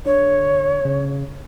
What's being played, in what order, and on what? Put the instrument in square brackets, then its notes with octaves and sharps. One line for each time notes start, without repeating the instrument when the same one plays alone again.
[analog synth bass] D3 [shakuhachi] C#5
[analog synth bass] C#3